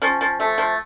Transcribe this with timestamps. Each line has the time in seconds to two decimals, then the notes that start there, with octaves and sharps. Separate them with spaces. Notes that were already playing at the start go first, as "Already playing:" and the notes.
0.02 F3 C#4
0.21 F3
0.40 A3
0.58 F3